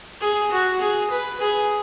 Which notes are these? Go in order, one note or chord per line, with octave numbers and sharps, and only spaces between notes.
G#4
F#4
G#4
B4
G#4